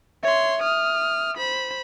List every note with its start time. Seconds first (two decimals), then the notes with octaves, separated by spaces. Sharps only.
0.23 C#5 E5 C6
0.63 D#6 F6
1.37 C5 B5